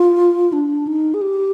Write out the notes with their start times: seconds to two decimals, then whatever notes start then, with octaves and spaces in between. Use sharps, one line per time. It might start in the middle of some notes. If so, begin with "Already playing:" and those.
Already playing: F4
0.53 D4
0.87 D#4
1.14 G#4
1.21 G4